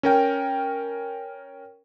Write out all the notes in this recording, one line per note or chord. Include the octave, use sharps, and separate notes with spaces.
C#4 A#4 G5